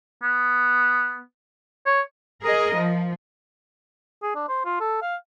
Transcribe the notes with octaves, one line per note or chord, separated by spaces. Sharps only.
B3
C#5
G#4 A#4 D#5
F3
G#4
D4
C5
F4
A4
F5